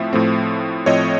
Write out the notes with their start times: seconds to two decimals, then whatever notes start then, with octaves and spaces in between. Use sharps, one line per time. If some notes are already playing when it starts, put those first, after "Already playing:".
Already playing: A2 F3 A3 C4 E5
0.13 A2 F3 A3 C4
0.86 A2 F3 A3 C4 C#5 D#5